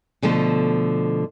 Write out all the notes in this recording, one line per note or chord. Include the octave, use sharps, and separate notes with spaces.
B2 D3 F3 A3